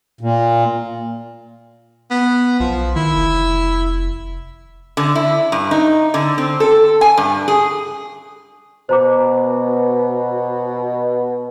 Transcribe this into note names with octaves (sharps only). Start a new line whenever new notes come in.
A#2
B3
B1 F3
D#3 E4
F1
D3
E4
G2
D#4
D3
C4
A4
G#5
G2
G#4
B2 C5 A#5 D6